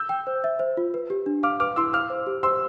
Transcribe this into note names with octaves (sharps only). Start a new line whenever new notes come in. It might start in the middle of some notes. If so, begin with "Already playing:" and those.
Already playing: E6 G6
G5
C5
E5
C5
F4
B4
G4
D4
F5 D6 F6
B4 D6 F6
E4 C6 E6
F5 D6 F6
C5
G4
C5 C6 E6